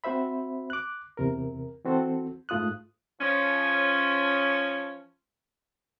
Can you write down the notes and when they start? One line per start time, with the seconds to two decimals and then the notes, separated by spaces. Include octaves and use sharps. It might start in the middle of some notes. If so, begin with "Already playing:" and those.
0.04 C4 F#4 C5 E5 B5
0.70 D6 F#6
1.17 E2 C3 A#4
1.85 E3 C4 F#4 A4 C5
2.49 G#2 A3 F4 D#6 F#6
3.20 F3 C#4